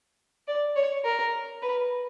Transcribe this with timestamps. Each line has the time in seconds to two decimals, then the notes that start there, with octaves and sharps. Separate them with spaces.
0.48 D5
0.76 C#5
1.05 A#4
1.62 B4